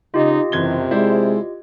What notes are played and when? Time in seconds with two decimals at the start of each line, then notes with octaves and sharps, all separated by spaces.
0.14 C#3 D#4 F4 G4 D#5
0.52 F#1 C3 E3 G#6 G7
0.91 G#3 E4 C5 D5